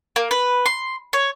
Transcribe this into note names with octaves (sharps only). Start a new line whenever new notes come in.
A#3
B4
C6
C#5